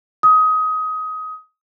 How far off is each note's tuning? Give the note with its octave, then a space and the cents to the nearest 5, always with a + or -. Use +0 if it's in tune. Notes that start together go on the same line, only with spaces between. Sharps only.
D#6 +20